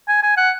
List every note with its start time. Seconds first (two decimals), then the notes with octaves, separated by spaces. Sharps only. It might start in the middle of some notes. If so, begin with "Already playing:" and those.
0.08 G#5
0.23 G#5
0.37 F#5